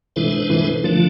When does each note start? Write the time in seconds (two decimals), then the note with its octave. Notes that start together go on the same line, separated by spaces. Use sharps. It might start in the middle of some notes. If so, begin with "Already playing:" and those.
0.16 B2 E3 G#3 D4 A4 C5
0.50 E3
0.84 D3 F3 A3 D4